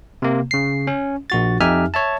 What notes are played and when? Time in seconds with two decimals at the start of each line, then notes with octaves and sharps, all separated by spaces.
0.22 C3 A#3
0.51 C#3 C7
0.87 C#4
1.30 A#1 F#4 A6
1.60 F2 D#4 G4 E5 G#5 F6
1.94 C#5 E5 A5